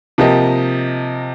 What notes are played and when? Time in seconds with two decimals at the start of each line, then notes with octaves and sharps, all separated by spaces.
0.18 C3 F3 A#3 G4 D#5